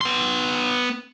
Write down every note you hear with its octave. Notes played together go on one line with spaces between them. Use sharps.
B3 C6